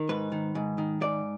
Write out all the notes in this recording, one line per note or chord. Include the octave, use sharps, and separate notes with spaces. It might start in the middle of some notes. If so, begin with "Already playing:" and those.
Already playing: D#3
G#2 B4
D#3
G#2
D#3
G#2 D5